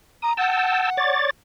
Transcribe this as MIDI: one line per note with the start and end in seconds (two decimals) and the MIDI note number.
0.22 0.33 82
0.22 0.33 87
0.37 1.16 78
0.37 0.90 79
0.37 0.90 81
0.37 0.90 88
0.97 1.30 73
0.97 1.30 74
0.97 1.30 93